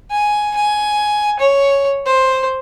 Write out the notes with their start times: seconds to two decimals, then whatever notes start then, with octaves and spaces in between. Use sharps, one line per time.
0.11 G#5
0.56 G#5
1.39 C#5
2.06 C5